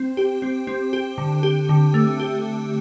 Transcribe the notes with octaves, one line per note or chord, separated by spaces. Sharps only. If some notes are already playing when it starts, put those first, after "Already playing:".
Already playing: C4
G4
C4
C4
G4
D3
G4
D3
A3
G4